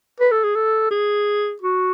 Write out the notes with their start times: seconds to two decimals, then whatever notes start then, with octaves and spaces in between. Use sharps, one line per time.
0.20 B4
0.31 A4
0.44 G#4
0.55 A4
0.91 G#4
1.62 F#4